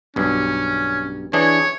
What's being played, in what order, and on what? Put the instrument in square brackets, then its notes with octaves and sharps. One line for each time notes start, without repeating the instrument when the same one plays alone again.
[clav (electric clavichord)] B1 G2 [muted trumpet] C#4
[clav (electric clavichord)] E3 D4 G#4 [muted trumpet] C#5